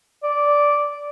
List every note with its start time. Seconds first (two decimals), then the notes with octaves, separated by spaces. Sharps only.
0.23 D5